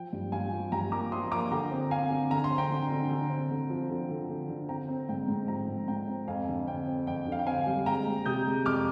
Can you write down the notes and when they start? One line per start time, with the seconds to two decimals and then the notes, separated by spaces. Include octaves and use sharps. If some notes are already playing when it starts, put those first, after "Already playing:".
Already playing: F3 G5
0.13 G2
0.32 G2 F5 G#5
0.52 F3
0.72 G2 G5 A#5
0.92 A#3 A#5 D6
1.12 F3 C6 D#6
1.32 A#3 A#5 D6
1.51 D3 G5 A#5
1.71 C4
1.91 C4 F5 G#5
2.11 D3
2.30 D3 A#5
2.44 C6
2.50 C4
2.58 G5 A#5
2.71 D3
2.91 D3
3.10 D3
3.30 C4
3.50 D3
3.70 F3
3.89 D3
4.09 D3
4.29 D3
4.49 D3
4.69 C4 G5 A#5
4.89 C4
5.09 G#2 G5
5.28 G#2
5.48 F3 G5 A#5
5.68 G#2
5.88 G#2 G5 A#5
6.08 C4
6.28 F2 F5 G#5
6.48 D3
6.67 C4 G5
6.87 C4
7.07 F2 G5
7.26 D3
7.32 F5
7.39 G5
7.46 C4 F5 G#5
7.66 G3
7.86 G#3 G5 A#5
8.06 G#3
8.26 C3 D#6 G6
8.46 G#3
8.66 F2 D6 F6